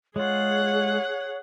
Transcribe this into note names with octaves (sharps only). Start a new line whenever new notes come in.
G#3 F4 G#4 C#5 F#5